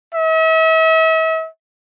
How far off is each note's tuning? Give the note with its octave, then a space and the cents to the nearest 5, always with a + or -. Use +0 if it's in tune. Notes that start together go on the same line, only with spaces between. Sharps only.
E5 -40